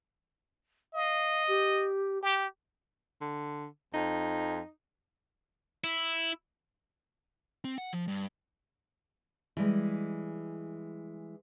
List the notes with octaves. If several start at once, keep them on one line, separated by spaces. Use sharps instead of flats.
D#5 F5
G4
G4 D6
D3
F2 D#4
E4
C4
F#5
F3
G2
E3 G3 G#3